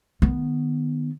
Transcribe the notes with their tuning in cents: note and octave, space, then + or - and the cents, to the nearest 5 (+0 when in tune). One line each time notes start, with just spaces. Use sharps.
D#3 -25 B3 +0